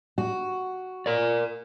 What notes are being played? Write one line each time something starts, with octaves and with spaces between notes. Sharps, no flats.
F#4
A#4 D5